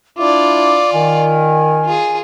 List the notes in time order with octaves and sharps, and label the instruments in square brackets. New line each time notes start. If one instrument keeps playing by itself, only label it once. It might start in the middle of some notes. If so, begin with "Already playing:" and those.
[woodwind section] A3 D4 E4 [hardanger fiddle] F4 D5 [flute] D6
[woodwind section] D#3 [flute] G#5
[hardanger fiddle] F4 G#4